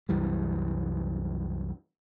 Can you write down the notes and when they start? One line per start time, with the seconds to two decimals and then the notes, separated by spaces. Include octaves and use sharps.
0.09 C2 F#2 E3 G3